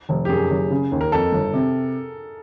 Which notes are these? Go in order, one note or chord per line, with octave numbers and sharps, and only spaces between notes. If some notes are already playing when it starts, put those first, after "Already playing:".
F1
G4
F#2 G#4
F#1
C#3
D#2
A#4
F2 A4
G1
C3